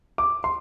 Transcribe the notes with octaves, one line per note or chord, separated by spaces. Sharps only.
D6
C6